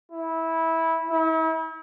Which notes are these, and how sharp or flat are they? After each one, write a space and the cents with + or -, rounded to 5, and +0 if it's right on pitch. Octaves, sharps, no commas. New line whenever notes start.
E4 -15
E4 -40